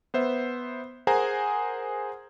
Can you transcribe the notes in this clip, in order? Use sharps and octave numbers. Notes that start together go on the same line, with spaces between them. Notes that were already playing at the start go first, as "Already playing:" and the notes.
B3 C5 E5
G#4 A#4 C5 F#5 G#5 A#5